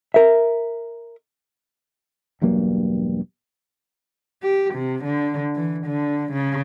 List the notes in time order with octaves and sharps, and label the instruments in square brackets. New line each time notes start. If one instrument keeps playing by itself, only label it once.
[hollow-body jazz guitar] A#4 E5
[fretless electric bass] E1 G2 F#3 A#3
[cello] G4
C3
D3
E3
D3
C#3